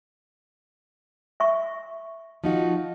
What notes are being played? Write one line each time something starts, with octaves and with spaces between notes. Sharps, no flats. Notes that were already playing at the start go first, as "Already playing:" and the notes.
E5 C#6
F3 D#4 F#4